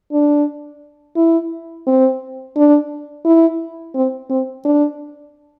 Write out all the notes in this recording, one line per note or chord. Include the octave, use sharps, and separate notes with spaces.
D4
E4
C4
D4
E4
C4
C4
D4